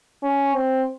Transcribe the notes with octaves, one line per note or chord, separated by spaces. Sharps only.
C#4
C4